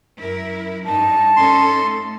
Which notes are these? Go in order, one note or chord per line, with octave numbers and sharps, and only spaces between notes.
F#2 E4 A#4
G2 D#4 A5
C#4 D#4 A4 C6
A3